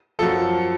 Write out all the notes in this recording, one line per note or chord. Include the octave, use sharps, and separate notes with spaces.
F#2 F3 A4